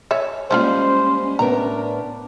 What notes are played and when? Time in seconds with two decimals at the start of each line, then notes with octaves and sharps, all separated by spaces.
0.11 C#5 E5 G#5
0.51 F3 G3 G#3 A#3 C#4 E4 F4 C5
1.39 A2 B3 D4 A#4 A#5